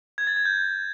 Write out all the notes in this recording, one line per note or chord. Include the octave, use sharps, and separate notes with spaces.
G#6
A6
G#6
G6